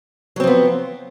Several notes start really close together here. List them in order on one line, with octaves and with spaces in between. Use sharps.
F#3 C4 F3 B3